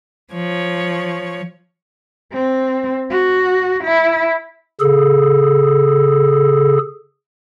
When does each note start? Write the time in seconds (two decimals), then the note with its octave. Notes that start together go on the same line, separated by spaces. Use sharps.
0.32 F3 C#5
2.33 C4
3.11 F#4
3.84 E4
4.80 C#3 G#4 A4